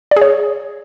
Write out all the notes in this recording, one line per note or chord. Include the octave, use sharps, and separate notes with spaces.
D5
G#4
C#5